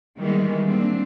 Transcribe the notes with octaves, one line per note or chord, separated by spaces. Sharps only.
D#3 E3 G3 G#3 B3
A#3 C4 D4